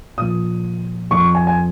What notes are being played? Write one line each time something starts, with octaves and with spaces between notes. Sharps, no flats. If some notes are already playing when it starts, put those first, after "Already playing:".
A#2 F3 D#6
F2 F3 C#6
G#5
G#5